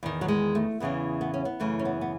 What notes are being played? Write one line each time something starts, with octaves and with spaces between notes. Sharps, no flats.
E2 D#3
F#3
G#3
A3
E2 C#3 E3 B3
B3
C#4
B3
F#2 C#3 E3 A3
C#4
B3
B3